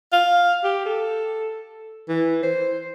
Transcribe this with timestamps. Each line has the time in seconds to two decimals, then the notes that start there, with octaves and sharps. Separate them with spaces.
0.13 F5
0.64 G4
0.86 A4
2.09 E3
2.43 C5